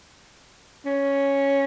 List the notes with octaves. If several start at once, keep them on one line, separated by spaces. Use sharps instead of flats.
C#4